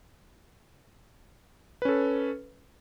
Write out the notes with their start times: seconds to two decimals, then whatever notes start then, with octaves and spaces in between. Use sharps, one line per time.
1.82 B4
1.85 C#4
1.89 A4